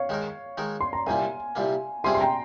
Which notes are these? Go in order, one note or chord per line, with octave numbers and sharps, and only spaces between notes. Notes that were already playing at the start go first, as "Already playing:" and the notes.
Already playing: C#5 F5
D#3 G#3 D#4 A#4
D#3 G#3 D#4 A#4
C6
A#5
C2 A#2 G3 A#3 F5 G#5
C2 A#2 G3 A#3
C3 G3 C4 F4 G#4 G#5 C6
C6
G5 A#5